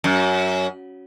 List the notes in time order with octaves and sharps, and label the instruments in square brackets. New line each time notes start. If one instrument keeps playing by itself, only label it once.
[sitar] F#2